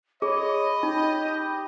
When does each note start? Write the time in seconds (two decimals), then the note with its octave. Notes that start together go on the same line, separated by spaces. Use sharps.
0.22 G#4 C#5 D#5 B5
0.83 D#4 G4